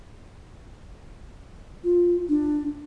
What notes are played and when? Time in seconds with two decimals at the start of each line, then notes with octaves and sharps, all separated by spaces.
1.84 F4
2.29 D4